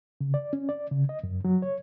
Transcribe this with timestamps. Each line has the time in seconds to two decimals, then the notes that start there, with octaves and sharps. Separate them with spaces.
0.21 C#3
0.34 D5
0.53 C#4
0.69 D5
0.91 C#3
1.09 D#5
1.24 F#2
1.45 F#3
1.62 C#5